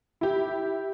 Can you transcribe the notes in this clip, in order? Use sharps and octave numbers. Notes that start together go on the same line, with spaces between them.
E4 G4